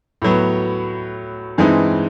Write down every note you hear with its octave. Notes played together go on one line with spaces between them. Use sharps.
A2 F#3 B3
G2 E3 G#3 C4 D#4